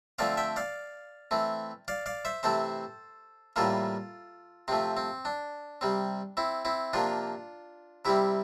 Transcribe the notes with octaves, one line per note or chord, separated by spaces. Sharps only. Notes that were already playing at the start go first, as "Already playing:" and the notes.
D3 F3 A3 C4 D5 F5
E5 G5
D5 F5
E3 A3 C4
D5 F5
D5 F5
C5 E5
C3 E3 A3 C4 A4 C5
A2 E3 G3 A#3 F4 A4
C3 F3 A3 C4
C4
D4
C3 G3 C4
C4 E4
C4 E4
C3 F3 A#3 D4 F4
C3 G3 C4 E4 G4